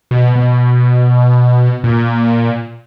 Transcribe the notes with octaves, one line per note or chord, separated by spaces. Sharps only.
B2
B2
A#2